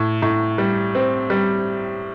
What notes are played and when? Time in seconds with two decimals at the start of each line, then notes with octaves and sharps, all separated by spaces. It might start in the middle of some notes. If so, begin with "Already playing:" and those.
Already playing: A2
0.22 A2
0.58 G3
0.95 C4
1.30 G3